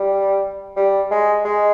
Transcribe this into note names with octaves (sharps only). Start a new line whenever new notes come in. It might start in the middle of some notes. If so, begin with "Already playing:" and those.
Already playing: G3
G3
G#3
G#3